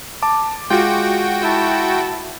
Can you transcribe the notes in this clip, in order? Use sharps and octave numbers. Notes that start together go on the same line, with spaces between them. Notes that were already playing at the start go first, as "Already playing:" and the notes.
A5 D6
G#3 F4 F#4 G5
E4 A5